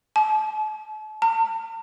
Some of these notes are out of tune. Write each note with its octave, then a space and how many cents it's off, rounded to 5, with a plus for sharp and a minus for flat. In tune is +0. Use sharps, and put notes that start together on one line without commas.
A5 -40
A5 +45